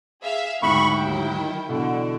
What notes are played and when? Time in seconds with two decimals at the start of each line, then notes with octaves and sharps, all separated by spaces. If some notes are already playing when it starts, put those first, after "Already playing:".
0.23 G#4 E5 F5
0.62 D2 G#2 F#3 E4 G5 B5 C#6
0.98 D#2
1.30 D#3
1.69 B2 D3 E3